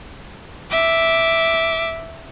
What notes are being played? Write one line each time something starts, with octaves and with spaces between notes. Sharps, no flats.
E5 D6